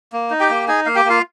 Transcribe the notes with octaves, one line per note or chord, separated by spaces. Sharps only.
A#3
D#4
G4 G5
A#3
D#4 G#4 G#5
A#3 F5
G4 G5
A#3 F4 F5